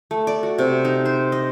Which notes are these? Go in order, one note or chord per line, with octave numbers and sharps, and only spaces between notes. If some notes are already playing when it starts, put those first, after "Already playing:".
A3
D5
F#4
C3
D#4
C5
D#5